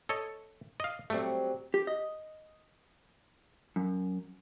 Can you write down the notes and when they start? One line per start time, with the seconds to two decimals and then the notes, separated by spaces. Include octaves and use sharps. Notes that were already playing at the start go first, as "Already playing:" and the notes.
0.09 A4 C#5 D#5
0.80 D#5 F5
1.10 F#3 G3 A3 C4
1.74 G4
1.87 D#5
3.76 F#2